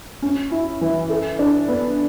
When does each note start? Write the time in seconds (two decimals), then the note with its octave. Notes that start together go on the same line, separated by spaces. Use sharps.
0.22 C#4
0.51 E4
0.81 E3
1.10 A4
1.39 D4
1.68 B3